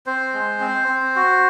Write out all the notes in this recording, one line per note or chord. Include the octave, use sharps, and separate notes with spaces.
C4 C5
G#3
C4
C4
F#4